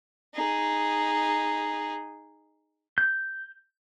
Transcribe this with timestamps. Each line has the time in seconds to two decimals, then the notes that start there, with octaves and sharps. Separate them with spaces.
0.34 D#4 G#4
2.98 G6